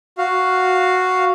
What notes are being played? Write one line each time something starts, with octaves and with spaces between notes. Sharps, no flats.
F#4 F5